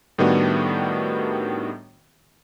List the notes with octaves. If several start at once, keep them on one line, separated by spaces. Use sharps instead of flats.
A2 D#3 G3 B3 D4 F#4